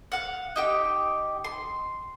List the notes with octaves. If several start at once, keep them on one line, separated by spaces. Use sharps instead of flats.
F5 F#5
D#4 G4 G5
C6